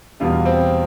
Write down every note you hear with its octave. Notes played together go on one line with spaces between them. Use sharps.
E2 B2 G3 F4
C4